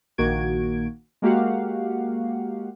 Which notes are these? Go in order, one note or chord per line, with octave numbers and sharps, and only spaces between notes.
A#1 D#3 A#3 F#4 G#6 D7
G#3 A#3 F#4 G4 F5 F#5